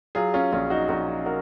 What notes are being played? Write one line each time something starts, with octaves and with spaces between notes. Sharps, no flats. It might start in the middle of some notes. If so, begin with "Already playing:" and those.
F#3 F4 G#4
C#4 F4
A#1 C#4 F4
D#4 F#4
A#1 D#4 F#4
F#4 A#4